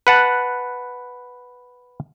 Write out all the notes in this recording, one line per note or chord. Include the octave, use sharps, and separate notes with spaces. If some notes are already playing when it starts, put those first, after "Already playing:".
B4 F#5 A5